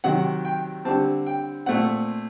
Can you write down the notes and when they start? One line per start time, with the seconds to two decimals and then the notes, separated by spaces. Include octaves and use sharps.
0.04 C3 D#3 F#3 F#5
0.45 G5
0.85 D3 G3 C4 A5
1.27 G5
1.66 A#2 A3 C4 F#5